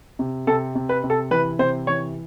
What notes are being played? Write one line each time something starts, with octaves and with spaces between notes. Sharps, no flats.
C3
C3 A4
C3
B4
C3
A4
E3 B4
C3 C5
E3 C#5